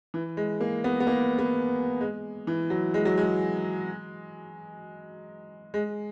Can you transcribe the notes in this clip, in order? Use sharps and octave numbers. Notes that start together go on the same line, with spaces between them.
E3
G#3
A#3
B3
B3
A#3
B3
G#3
E3
F#3
G#3
F#3
G#3
G#3